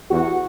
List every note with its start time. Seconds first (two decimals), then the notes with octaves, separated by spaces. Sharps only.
0.11 E2 F#4